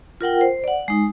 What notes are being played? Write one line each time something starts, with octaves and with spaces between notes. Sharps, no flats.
F4 A#4 F#5 G5
C5
D5 F#5
G#3 D#4